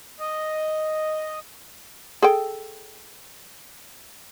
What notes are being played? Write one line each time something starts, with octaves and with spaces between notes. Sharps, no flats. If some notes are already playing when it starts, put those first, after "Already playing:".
D#5
G#4 A4 G5